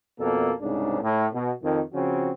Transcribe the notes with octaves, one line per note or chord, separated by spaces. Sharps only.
F2 B2 A#3 A4
C2 G#2 C#3 D4
A2
B2
F2 D#3
C#3 F3 C4 F#4